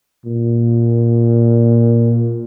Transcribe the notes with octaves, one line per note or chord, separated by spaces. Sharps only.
A#2